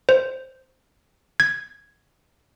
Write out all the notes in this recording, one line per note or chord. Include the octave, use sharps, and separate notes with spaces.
C5
G#6